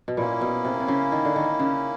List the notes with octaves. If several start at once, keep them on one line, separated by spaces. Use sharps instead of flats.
B2
A#2 A#3 C#4 E4
B2
C3
C3
C#3
D#3
D3
D#3
C#3